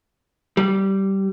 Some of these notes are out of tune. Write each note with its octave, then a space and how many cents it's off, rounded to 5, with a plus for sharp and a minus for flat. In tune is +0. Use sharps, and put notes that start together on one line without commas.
G3 -15